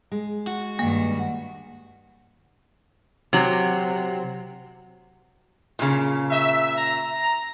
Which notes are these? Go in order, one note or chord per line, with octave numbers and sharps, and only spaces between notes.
G#3
F#4
G2 D#3 A#3
C3 F#3
A#2 C#3
E5
A#5